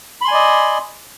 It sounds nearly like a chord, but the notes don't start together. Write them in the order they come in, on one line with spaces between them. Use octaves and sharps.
B5 C6 G#5 D5 D#5